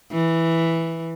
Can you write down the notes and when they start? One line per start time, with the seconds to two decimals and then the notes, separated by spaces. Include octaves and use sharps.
0.12 E3